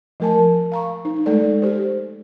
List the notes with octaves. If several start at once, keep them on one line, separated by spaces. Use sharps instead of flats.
F3 A3 A#4 G#5 A5
F5 A#5 C#6
D#4
G#3 A3 A4 D5
G4 C5